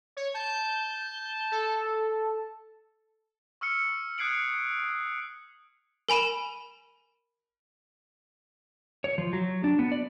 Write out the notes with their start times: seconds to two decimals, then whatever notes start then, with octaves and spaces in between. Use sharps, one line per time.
0.17 C#5
0.34 A5 G6
1.52 A4
3.61 C#6 E6 F6 C#7
4.18 D#6 F#6 G#6 C7 D7 F#7
6.09 A#4 G#5 B5 D#7 E7
9.04 C#5
9.18 F3
9.33 F#3
9.64 D4
9.79 B3
9.92 D5